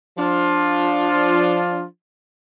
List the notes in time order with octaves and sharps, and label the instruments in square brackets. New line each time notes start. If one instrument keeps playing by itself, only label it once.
[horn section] F3 D4 F4